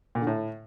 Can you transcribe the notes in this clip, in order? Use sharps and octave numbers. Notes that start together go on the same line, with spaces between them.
A#2
D3
A2